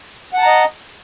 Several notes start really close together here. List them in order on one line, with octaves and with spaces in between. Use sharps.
F#5 A5 A#5 D#5